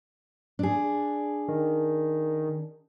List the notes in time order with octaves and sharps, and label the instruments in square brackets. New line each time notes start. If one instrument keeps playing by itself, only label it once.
[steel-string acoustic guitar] D4 G#4
[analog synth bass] D#3